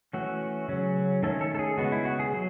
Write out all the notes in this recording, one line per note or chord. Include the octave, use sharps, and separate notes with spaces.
E3 A3 C#4 F#4
C#3 F#3 C#4
D#3 A3 C#4 A4
A4
A4
G#4
C#3 G#3 B3 F#4
E4
F#4
G#4
F#3